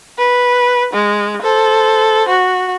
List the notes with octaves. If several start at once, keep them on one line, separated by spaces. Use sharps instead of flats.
B4
G#3
A4 C5
F#4